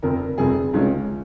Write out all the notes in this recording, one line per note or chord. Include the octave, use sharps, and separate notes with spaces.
F1 F2 C3 A#4
F1 F2 C3 G#4
C#2 C3 F3 G#3 C#4